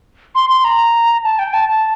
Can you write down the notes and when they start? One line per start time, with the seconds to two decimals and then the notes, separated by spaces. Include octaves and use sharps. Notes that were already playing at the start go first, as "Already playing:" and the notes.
0.35 C6
0.50 C6
0.64 A#5
1.24 A5
1.39 G5
1.54 A5
1.69 A5